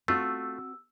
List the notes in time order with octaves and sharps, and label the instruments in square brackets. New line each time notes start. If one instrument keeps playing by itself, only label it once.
[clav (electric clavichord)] A3 F4 [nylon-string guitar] C4 F#4 [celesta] E6